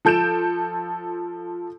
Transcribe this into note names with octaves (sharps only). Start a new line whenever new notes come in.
F3 A4 G6 D7 E7